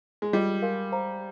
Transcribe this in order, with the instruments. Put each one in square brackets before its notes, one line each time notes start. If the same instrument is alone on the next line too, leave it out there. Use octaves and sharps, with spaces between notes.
[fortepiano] G#3
[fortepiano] G3 [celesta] F4 G#4 D#5
[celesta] A#4 F5 G#5 C6
C5 F5 A#5